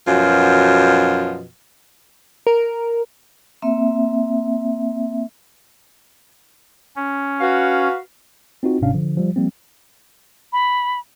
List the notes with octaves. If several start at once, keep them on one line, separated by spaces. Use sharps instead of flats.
F#2 B2 F3
A#4
A#3 C4 E5
C#4
F#4 B4 F5
C4 D#4 F4 F#4
G1 G#2 C3 C#4 D4 F5
D3 F3
F3 G3
F3 G3 A#3 C4
B5